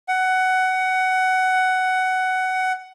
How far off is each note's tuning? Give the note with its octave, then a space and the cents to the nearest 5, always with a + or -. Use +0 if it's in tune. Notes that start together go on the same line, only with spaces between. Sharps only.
F#5 +15